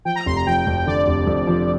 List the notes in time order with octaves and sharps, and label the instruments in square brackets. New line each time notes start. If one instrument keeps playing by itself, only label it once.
[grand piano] F3 [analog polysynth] G5
[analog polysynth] A#5
[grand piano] F1 [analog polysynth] C6
[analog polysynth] A#5
[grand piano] F3 [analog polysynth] G5
[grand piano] F2
[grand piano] D3 [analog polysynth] D5
[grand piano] F1
F2
F3